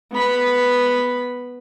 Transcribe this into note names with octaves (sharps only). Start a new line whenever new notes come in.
B3 B5